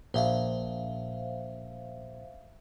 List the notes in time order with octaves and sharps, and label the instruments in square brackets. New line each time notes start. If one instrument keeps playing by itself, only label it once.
[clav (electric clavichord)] A#1 [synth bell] C5 E5 F5